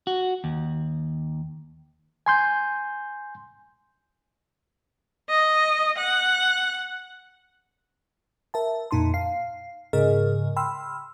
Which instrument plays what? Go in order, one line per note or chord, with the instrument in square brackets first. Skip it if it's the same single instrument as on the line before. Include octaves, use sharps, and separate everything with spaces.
[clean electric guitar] F#4
D#2
[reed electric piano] G#5 C6 G6
[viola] D#5
F#5
[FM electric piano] A#4 E5 A5
F2 A#2 D#4 A5 C6
F5 C7
G#2 C#3 G#4 A#4 D#5 F6
G5 B5 C6 E6 F6